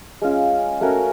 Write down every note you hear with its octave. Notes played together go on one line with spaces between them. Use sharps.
G#3 C#4 F4
A3 C#4 F#4 A#4